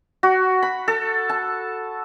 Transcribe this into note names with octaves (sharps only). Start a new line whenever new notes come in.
F#4
B5
A4
A5